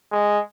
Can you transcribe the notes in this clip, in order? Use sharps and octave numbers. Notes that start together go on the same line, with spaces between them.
G#3